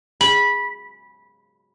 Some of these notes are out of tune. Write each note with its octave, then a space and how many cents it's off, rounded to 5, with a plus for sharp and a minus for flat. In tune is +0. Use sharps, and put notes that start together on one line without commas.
B5 -15